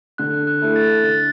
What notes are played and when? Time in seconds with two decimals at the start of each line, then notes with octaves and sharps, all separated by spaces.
0.18 D3 F#6
0.47 F#6
0.62 A3 E4 A4
0.76 A6
1.04 D3 A6